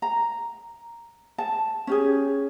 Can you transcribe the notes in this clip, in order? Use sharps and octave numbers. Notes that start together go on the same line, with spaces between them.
A#5
A5
C#4 G4 G#4